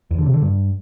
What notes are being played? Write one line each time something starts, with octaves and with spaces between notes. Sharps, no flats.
E2
D3
C3
D3
G2